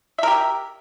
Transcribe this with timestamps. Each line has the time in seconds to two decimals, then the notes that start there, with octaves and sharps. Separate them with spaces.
0.18 E5
0.23 A#4
0.28 G4